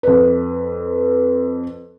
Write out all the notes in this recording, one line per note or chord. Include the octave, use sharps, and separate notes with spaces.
F2 B4